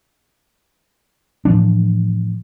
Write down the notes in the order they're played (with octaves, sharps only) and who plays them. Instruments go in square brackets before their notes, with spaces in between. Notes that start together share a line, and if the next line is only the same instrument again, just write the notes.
[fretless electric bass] A2 E3 F3 D4